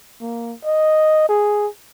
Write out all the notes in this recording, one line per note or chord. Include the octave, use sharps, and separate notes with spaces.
A#3
D#5
G#4